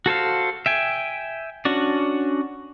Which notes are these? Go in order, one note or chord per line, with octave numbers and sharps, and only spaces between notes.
F#4 A4 C5 F5
E5 G5 G#5
C#4 D4 F#4 D5